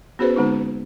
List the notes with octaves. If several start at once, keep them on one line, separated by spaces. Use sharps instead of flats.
B3 C#4 F#4 G#4 B4 C5
D3 G#3 B3 C4 D#4